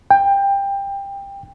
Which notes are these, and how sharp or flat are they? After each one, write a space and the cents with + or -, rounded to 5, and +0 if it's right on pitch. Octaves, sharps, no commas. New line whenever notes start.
G5 +20